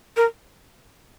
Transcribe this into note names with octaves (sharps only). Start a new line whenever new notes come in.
A#4